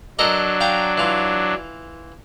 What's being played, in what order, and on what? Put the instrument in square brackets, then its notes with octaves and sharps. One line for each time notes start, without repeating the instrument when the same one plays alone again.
[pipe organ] F#3 D4 [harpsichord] A4 A#4 D#5
[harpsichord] F5 G5 A#5
E3 F4